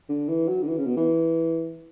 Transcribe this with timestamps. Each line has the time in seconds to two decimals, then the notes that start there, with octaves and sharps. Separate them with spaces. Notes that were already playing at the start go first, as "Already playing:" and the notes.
0.09 D3
0.28 E3
0.49 F#3
0.63 D3
0.68 E3
0.78 C#3
0.86 B2
0.97 E3